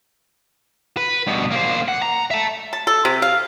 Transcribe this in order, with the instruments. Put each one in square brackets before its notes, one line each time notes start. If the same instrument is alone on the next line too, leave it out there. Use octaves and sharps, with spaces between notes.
[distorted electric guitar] B4
G2 B2
A#3 C5
F#5
A#5
E5 A5
[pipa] A5
A4
C3
F5